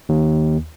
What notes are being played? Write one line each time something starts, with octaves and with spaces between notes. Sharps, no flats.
D#2